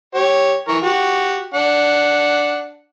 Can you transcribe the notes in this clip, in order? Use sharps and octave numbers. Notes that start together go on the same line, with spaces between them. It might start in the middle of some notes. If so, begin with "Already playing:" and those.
G4 C#5
E3 A#4 C#6
F#4 G4
D4 F#5